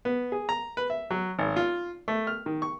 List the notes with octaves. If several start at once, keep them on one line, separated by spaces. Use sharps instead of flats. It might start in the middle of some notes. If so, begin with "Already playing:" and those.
B3
G#4
A#5
B4
E5
F#3
G#1
F4
A3
F6
D#3
C#6